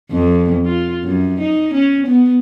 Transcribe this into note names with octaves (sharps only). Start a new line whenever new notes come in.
F2
F4
F#2
D#4
C#4
B3